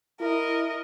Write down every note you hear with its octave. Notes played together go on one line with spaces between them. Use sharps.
E4 A#4 D#5